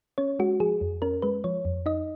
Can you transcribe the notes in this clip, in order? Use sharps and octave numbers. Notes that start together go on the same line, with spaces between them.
C#4 C#5
G#3 F#4
F3 G#4
F2
C#4 A#4
G#3 B4
F3 C#5
F2
D#4 D#5